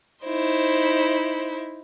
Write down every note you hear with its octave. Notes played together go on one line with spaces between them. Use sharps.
D#4 E4 C5